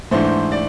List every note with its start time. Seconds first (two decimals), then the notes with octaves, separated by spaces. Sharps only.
0.11 G#2 E3 A3 D4 C5
0.52 D5